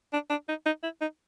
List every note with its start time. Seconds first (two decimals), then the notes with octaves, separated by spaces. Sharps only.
0.13 D4
0.30 D4
0.49 D#4
0.66 D#4
0.83 E4
1.01 D#4